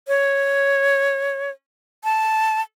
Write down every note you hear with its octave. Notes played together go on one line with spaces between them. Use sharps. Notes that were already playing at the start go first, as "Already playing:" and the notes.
C#5
A5